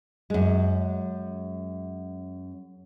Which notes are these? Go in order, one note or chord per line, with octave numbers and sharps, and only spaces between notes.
F#2 G#3